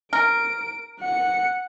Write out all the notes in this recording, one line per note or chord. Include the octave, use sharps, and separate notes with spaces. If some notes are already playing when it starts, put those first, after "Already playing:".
A#4 D7
F#5 C#7